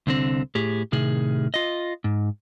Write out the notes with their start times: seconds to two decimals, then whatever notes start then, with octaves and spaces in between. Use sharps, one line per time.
0.07 C2 D3 C4
0.55 A2 G4 G#4
0.92 A2 C3 D#3 G#4
1.54 F4 D#5
2.04 G#2